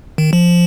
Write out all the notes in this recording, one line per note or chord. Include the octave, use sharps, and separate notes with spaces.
D#3
F3